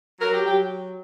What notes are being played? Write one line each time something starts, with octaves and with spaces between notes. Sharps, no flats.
F#3 A#4
G4
F#3 G4